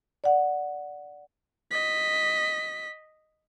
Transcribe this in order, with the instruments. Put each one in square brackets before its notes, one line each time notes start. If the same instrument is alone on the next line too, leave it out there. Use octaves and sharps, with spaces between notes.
[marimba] D5 F#5
[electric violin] D#5 B6